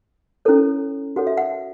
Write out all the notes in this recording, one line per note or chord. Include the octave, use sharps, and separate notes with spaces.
C#4 E4 A4 C#5
F#4 A4 C#5 F#5
E5
F#5